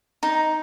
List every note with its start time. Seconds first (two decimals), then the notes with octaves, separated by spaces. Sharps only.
0.23 D#4